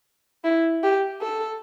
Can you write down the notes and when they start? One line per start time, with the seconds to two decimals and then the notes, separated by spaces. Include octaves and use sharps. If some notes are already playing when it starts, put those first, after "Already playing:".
0.44 E4
0.83 G4
1.22 A4